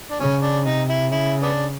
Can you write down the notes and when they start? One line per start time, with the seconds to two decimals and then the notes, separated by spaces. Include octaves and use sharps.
0.10 D4
0.20 C#3 C#4
0.42 D4
0.65 C3 D#4
0.89 E4
1.11 C#3 E4
1.43 B3 D4